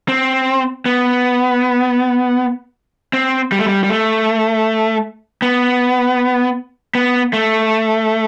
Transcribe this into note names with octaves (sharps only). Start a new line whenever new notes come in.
C4
B3
C4
G3
A3
G3
G3
A3
B3
B3
A3